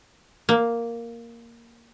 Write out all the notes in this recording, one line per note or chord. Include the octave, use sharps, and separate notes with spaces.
A#3